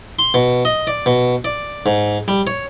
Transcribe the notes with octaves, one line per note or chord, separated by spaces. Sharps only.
C6
B2
D#5
D5
B2
D5
G#2
G3
C#5